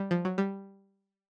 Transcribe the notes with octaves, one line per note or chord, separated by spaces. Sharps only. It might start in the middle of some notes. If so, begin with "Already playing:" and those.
Already playing: G3
F3
F#3
G3